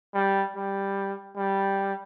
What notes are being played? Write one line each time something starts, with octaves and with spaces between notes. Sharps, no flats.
G3
G3
G3